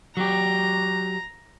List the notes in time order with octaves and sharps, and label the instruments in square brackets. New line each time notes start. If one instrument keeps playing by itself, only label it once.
[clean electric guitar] F#3 G4 [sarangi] A#5